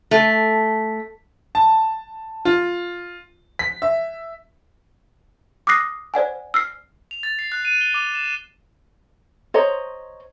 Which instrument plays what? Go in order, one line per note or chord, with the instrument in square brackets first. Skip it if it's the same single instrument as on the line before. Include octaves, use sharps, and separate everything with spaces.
[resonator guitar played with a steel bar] A3
[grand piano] A5
F4
B6
E5
[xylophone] D6 D#6 F6 F#6 A#6 C7
C5 D5 F#5 G#5
E6 F6 C7
[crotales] F7
A6
C7
F#6
D#7
G7
D6
E7
[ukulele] C5 C#5 D#5 A#5